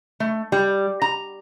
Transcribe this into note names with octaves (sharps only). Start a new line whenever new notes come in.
A3
G3
A#5